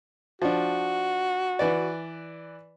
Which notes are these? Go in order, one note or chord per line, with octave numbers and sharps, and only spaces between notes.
F3 D4 F#4
E3 B4 D5